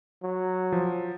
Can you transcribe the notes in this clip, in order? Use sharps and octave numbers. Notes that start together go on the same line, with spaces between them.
F#3
F3